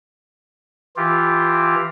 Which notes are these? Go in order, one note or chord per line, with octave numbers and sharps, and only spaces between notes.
E3 F4 G4